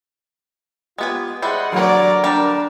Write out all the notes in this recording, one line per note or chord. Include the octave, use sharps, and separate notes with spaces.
G#3 B3 F4 G4 G#5
G3 E4 G#4 C5 D#5 F#5
D3 F#3 A#4 D5 A#5
G3 D4 G4